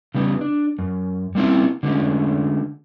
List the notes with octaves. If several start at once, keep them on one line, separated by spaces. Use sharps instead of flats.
C#3 G3 B3
D4
F#2
G3 A#3 C4 C#4 E4
D3 G#3 A3 C#4